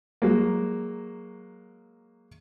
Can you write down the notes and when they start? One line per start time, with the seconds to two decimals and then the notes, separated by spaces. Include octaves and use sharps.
0.22 F#3 G#3 A#3